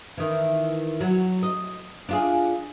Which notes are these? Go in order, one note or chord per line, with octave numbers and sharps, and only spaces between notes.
D#3 E3
F#3
D#5
D4 F4 G#4